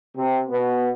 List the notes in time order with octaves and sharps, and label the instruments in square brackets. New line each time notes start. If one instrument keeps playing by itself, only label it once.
[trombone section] C3
B2 B3